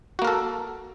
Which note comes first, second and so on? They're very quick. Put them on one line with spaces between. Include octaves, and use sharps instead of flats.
F#4 A#3 A#4 A4